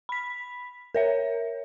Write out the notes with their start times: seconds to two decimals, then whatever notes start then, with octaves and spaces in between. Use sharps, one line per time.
0.09 B5 B6
0.95 A#4 C#5 E5